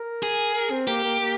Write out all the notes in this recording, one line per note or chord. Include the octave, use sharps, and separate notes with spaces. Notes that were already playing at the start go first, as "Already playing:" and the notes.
Already playing: A#4
G#4
A#4
C4
A#3 G4
A#3
A#3